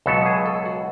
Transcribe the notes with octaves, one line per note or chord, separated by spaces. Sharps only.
C#2 B2 F#3 B3 A4
G#4
A4
F#4